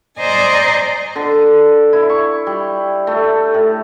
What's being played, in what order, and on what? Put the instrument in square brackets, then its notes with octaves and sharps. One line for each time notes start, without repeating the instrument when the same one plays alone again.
[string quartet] C5 D5 D#5 G#5 A#5
[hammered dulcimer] D3
E4
C#6
G3
A3
A2